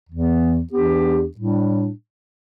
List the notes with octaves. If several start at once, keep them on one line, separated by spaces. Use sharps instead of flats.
E2 E3 B3
E2 E3 B3 D4 G4
A2 G3 D4